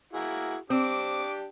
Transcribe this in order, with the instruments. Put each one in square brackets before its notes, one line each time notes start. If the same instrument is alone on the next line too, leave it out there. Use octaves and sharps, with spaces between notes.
[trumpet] A#3 [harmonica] E4 F#4 G#4
[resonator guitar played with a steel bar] C4 [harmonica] D4 G4 [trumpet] D6